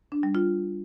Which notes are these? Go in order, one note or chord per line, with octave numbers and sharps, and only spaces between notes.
D4
G3
F4